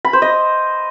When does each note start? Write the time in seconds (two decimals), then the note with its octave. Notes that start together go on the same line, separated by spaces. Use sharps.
0.05 B5
0.13 C5
0.22 D#5